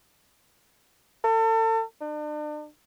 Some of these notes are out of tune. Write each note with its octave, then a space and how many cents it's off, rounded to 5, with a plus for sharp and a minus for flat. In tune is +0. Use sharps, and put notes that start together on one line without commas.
A4 +35
D4 +40